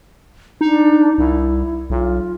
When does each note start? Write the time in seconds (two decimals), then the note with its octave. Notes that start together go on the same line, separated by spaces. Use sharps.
0.61 D4 D#4
1.18 C2 E4
1.90 B1 F4